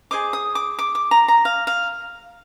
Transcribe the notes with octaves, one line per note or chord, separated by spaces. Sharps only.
G#4 C5 D#5 D6
D#6
D6
D6
D6
A#5
A#5
F5
F5